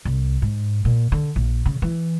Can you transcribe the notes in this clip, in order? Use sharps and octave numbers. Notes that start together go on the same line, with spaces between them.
C2
G#2
A#2
D3
A#1
C#3
E3